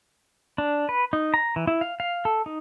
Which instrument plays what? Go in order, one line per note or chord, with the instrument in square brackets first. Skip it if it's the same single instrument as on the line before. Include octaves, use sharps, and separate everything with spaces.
[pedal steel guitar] D4
B4
D#4
A#5
E3
E4
F5
F5
A4
D#4